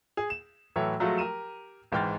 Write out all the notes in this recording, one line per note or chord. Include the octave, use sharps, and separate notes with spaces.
G#4
E7
A2 E3 F#3 A4 C#5 E5
F3 F#3 G#3 A3 F4 F#4
G4 A#4 D#7 E7
G#1 G#2 E3 G5 F6 A6